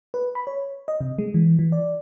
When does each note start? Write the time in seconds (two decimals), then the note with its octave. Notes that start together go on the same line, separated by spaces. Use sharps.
0.14 B4
0.35 B5
0.47 C#5
0.88 D#5
1.01 C3
1.18 G#3
1.34 E3
1.59 E3
1.72 D5